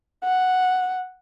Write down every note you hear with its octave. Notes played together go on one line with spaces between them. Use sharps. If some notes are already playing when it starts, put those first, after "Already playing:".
F#5